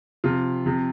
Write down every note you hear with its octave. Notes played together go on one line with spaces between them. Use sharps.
C3 F3 F4
C3 F3